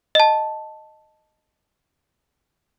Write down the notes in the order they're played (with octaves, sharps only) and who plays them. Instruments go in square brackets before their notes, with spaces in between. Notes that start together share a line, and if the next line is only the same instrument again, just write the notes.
[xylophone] D#5 A5